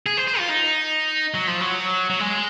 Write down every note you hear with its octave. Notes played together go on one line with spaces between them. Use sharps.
G#4
C5
C5
F4
D#4
F#3
F3
F#3
F#3
G#3